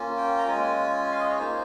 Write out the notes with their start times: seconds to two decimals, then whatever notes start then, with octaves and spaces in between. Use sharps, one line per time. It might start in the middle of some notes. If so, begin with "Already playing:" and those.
Already playing: A#3 C#4 F4
0.17 G5
0.39 A#5
0.48 G#3 C#4 F4 G#5
1.11 F5
1.19 D#5
1.29 C#5
1.38 A#3 D#4 C5